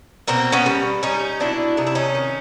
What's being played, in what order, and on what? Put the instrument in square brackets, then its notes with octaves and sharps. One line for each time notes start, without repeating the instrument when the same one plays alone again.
[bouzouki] B2 A#3 C4
B3 C#4
G3
G3 C#4 D#4
B2 D4 E4
C3 D#4
E4
C#4 D#4
D#3